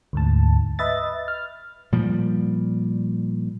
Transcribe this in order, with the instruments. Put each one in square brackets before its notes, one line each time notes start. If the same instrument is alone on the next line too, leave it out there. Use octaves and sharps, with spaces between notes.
[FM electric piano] D2 G#2 A5
B4 D#5 E5 A6
F6
[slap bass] A#2 F3 G3